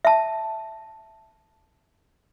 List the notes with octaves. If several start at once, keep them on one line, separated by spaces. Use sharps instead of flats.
E5 A5